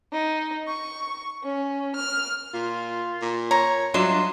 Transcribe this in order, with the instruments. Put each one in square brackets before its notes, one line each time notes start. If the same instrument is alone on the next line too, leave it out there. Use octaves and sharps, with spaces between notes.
[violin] D#4
C#6
C#4
F6
[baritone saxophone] A#2 [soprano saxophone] F4
[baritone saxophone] A#2
[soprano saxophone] C#5 [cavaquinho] A#5
[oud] F#3 D4 E5 [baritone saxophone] F4 [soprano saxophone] D#5 [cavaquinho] C6